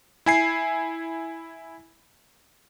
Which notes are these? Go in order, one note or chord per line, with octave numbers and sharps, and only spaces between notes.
E4 G#5 C7